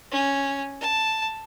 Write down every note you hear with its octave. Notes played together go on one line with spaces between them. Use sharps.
C#4
A5